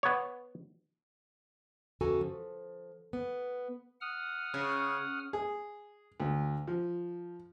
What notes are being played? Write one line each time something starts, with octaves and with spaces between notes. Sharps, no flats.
B3 C#5
E2 C#3 F#4 A4 G#5 A#5
F3
B3
F#5 D#6 F6
C#3
G#4
D2
F3